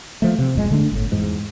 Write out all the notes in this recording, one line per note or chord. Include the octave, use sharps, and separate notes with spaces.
F3 A3
C3
D#1 F2 G#3
D3 A3 D4
G1 A2
E2 G#2